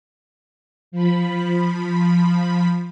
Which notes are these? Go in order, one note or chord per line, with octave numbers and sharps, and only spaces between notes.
F3 B5